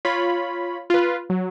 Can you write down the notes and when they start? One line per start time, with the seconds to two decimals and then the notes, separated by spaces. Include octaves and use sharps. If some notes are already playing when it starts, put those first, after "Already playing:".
0.05 F4 C#5 B5
0.90 F4 B4
1.30 F#3